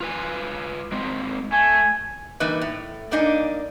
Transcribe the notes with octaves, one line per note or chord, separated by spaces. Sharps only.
F4 B4 G#5
G#3 A#3 C4
A3 G#5
E3 G3 A#3 D#4 B4
A2
G2 A#3 D4 D#4 D#5 G#5